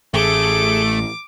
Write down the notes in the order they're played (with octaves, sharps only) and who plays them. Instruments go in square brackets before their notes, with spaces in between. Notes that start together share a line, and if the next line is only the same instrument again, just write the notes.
[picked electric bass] A1 [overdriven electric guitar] A3 [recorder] G#4 [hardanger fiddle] D6